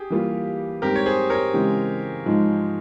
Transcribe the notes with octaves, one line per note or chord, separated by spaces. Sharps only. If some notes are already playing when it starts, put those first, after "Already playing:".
Already playing: G4 G#4
E3 G3 A#3 F4
G#2 G3 C4 G4 A#4
C#5
G#4 C5
A#4 C#5
C#3 E3 G#3 C4 G4
G#2 F3 G#3